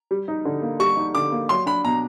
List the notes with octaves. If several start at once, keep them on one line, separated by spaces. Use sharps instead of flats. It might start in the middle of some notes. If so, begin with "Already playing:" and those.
G3
D#4
D3
A#3
G3 C#6
D#4
D3 D6
A#3
F#3 C6
D4 B5
B2 A#5